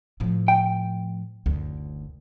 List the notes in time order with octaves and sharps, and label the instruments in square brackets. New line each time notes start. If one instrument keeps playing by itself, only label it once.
[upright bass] A2 F3
[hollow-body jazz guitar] G5
[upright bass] F#1 D2